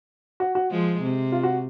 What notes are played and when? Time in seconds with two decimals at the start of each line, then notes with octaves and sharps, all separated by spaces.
0.40 F#4
0.55 F#4
0.71 F3 G#3
1.02 C3
1.32 F4
1.43 F#4